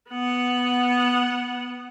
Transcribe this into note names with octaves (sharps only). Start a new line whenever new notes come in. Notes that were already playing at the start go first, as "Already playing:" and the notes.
B3 F#5